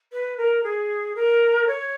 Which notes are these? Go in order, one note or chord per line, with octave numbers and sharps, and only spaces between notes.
B4
A#4
G#4
A#4
C#5